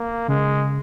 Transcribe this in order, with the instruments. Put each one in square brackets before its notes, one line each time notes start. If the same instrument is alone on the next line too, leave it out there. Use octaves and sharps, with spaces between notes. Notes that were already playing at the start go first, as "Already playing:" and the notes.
Already playing: [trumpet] A#3
[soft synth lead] C#3 [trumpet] G#3